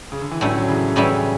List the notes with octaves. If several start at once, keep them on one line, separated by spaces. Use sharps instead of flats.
C#3
D3
E3
A2 D3 F#3 G3 C#4 E4
F#3
C#3 E3
A2 C#3 E3 G3 C#4 E4